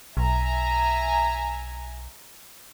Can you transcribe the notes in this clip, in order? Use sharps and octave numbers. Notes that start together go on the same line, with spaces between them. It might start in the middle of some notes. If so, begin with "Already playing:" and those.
B1 E5 G#5 A#5